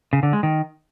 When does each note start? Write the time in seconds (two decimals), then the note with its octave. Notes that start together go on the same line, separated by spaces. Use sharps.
0.13 C#3
0.23 D3
0.33 G#3
0.43 D#3